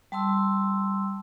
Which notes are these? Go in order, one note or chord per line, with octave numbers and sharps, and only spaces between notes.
G3 A5 C6 E6